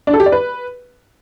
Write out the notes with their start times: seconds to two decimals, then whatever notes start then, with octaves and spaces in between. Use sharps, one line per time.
0.07 D4
0.13 A4
0.20 G4
0.26 D5
0.32 B4